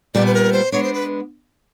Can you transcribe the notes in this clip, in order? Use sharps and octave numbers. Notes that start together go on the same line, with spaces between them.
A#2 G3 B3 D5
B4
A#4
C5
G#3 B3 D4 C#5
C5
B4